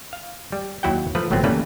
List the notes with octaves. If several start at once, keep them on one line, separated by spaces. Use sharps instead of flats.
F5
G3
D#2 F#3 E4 F#4 F#5 G5
F3 A3 B4
G1 A2 F#3 A3 B3 C4
E3 G3 A3 A#3 C#4 B4